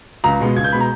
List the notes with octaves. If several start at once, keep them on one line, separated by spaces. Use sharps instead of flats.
C#2 A#5
B2 G#3 B3
C#2 G#6
G6
B2 G#3 B3 B5
A#5